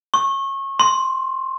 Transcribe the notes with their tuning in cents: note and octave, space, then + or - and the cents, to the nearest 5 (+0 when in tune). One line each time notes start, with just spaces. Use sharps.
C#6 -30
C6 +5